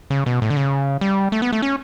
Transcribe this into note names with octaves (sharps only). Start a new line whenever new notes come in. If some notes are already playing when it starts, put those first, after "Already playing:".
C#3
B2
A2
D3
C#3
G3
A3
B3
A3
C#4